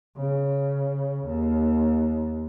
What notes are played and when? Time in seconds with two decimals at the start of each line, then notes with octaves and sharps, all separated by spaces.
0.16 C#3
1.25 D#2